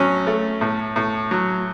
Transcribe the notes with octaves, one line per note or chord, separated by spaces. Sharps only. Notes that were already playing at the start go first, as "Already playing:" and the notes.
Already playing: A2 F#3 C#4
A3
A2
A2
F#3